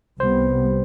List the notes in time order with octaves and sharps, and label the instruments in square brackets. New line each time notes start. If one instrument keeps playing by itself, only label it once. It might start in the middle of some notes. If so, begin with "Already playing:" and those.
[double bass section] C2 C3 G3 B3 [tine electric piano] C5